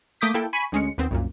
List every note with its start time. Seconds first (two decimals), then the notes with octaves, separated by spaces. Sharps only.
0.21 A3 A#3 D6 D#6 G6 B6
0.34 A#3 E4 A4 G5
0.53 G#5 B5 C#6 B6 D#7
0.72 D2 G#3 C#4 C#7
0.98 D#2 B3 C4
1.11 C2 F#2 A#2